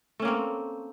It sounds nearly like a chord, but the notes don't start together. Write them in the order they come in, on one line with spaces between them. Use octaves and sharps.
A3 C#4 A#3 C4